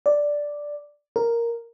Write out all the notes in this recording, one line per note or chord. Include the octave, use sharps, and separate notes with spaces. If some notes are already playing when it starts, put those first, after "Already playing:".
D5
A#4